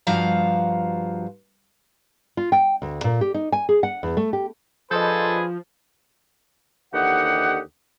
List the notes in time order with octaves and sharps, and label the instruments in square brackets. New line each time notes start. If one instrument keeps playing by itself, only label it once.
[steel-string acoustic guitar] G2 F3 F#4 F5 A#5
[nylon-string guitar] F4
G5
D2
A#2
G4
D#4
G#5
G#4
F#5
E2
A3
G4
[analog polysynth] F3 [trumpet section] D4 G#4 B4 [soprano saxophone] A4 [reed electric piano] D#5 C6 G6
[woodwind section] D#2 D3 E3 G4 D#5 F#5